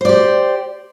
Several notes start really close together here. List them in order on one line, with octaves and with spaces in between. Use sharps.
C5 D5 G4